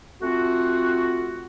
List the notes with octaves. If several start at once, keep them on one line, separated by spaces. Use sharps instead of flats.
A3 C4 F4 F#4